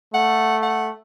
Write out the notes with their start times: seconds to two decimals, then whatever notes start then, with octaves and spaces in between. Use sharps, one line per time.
0.14 A3 F#5
0.63 F#5